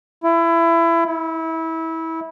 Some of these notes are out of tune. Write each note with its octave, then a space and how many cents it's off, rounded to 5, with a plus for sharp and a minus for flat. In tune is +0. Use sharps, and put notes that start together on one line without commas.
E4 +25
E4 -25